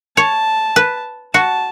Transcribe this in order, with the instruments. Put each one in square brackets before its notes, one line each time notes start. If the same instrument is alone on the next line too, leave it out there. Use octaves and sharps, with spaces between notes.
[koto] C#5 [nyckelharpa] A5
[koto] B4
[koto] F#4 [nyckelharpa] A5